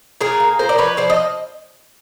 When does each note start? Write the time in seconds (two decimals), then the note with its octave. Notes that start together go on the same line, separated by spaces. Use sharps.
0.21 A#2 G#4 A#4
0.40 A#3
0.59 A#2 A#4 C5
0.69 D5
0.78 F3 B4 C#5
0.97 F3 C5 D5
1.10 D#5